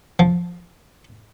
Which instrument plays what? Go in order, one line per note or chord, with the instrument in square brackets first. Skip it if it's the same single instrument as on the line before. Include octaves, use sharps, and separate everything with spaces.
[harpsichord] F3